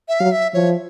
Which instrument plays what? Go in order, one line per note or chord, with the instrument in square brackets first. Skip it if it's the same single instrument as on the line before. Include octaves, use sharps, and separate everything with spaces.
[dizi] E5
[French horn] F#3 [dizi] F5
[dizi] E5
[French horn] F3 [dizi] C#5